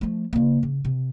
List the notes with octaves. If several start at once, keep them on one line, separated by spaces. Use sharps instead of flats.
F3 A3
C#3 A#3
C#3
C3